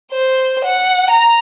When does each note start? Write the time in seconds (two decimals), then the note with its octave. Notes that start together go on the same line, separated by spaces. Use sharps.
0.12 C5
0.65 F#5
1.10 A#5